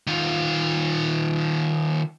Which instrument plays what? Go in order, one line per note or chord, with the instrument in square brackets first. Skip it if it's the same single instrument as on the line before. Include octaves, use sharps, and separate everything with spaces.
[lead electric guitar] D#3 F4